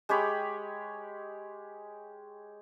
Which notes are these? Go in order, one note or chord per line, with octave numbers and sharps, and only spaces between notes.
G#3 G4 C#5 B5